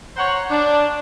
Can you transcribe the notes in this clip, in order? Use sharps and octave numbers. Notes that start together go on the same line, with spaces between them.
C5 C#5 F#5 A#5
D4